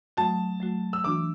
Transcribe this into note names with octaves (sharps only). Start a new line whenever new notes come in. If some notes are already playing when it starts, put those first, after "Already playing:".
F#3 A3 F#4 A5
F#3 A3 F#4
E6
E3 D4 F#4 D6